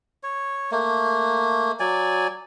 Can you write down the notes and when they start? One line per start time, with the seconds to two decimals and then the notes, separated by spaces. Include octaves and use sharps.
0.23 C#5
0.71 A3 A#3
1.80 F#3 D5 G#5